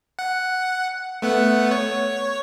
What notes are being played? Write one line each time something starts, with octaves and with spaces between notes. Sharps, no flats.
F#5
A3 B3 F#5
C#5